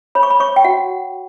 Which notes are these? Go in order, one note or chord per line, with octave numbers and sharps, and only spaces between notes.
C#5 B5
C#6
B5
C#5 C#6
G5
F#4 F#5